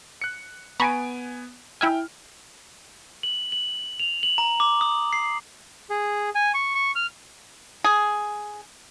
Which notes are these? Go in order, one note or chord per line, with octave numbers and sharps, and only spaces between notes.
F#6 C#7
B3 G#5 A#5 B5 C#6 D7
E4 E5 G5 G#5 F6
F#7
F#7
F7
F#7
A#5
D6
D#6
C7
G#4
G#5
C#6
C#6
F6
G#4